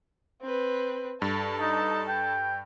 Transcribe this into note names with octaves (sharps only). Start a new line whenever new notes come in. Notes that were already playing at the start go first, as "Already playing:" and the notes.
C4 B4
G2 A4 A5
D#4
G5